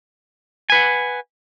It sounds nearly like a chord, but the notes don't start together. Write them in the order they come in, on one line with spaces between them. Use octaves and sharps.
G#5 B4 F#5